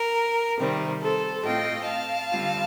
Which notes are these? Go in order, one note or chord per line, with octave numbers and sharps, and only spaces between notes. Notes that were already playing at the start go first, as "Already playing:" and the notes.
Already playing: A#4
C3 D#3 G3 C4
A4 C5
A2 A3 C4 F4 D#5 G5
F5 A5
D3 G3 C4 F4